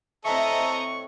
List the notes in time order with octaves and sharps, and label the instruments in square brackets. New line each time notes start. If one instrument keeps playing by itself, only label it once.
[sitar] A2 E5 [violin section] C4 D#5 A#5 [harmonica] A4 [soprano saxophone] C#6